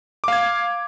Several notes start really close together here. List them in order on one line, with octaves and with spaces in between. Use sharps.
D6 F5 G#6